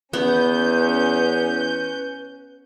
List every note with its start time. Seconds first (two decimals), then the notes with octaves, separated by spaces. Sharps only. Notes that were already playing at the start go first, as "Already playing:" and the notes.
0.13 E2 B3 C#4 B4 G6